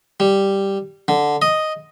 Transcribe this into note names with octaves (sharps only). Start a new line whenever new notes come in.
G3
D3
D#5